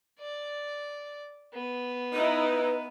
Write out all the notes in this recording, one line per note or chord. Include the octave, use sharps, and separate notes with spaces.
D5
B3
D#4 E4 B4